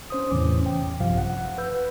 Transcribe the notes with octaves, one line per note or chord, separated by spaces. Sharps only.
C#4 C5 D#6
E2 A2 C3 E3 C#4 D6
G5
A#1 G2 C3 F3 F5
F#5
B4 E6 G6